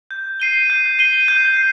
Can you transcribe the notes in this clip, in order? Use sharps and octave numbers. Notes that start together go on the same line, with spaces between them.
G6
C7 D#7 G7
G6
C7 D#7 G7
G6
C7